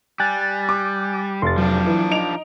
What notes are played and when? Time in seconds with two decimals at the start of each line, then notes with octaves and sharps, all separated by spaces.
0.20 G3 G#5 F#6 A6
0.69 D6
1.42 F1 C6 A6
1.58 F3 F#3 D4
1.87 E3
2.11 D#4 D7 F7